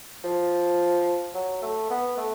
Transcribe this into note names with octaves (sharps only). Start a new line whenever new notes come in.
F3
F#3
A3
B3
A3